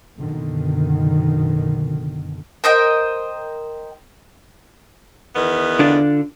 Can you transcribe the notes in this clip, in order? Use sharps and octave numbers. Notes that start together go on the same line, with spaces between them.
F#1 B2 D3 D#3
A#4 C5 D#5 G5
E2 D#3 B3
D3 D4 F4